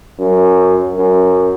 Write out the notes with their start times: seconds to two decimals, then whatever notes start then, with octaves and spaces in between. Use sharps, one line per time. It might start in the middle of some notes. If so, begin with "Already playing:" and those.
0.19 F#2
0.96 F#2